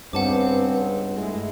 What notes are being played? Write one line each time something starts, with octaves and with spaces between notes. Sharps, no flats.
C#2 G2 B3 C4 F#5 A5 D6
G#3 A3 E4